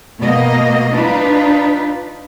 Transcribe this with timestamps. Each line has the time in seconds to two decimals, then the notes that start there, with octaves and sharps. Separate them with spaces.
0.18 B2 A3 A#3 D#5
0.94 D4 D#4 F4 B4